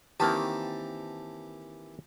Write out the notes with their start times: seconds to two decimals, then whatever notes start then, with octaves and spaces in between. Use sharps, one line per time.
0.20 D#3 E3 A#3 C4 G4 A5